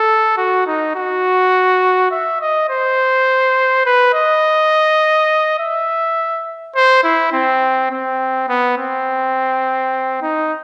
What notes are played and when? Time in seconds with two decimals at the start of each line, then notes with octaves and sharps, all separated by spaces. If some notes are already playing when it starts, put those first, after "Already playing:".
Already playing: A4
0.37 F#4
0.67 D#4
0.96 F#4
2.11 E5
2.41 D#5
2.69 C5
3.86 B4
4.14 D#5
5.59 E5
6.76 C5
7.04 E4
7.33 C4
7.91 C4
8.49 B3
8.78 C4
10.22 D#4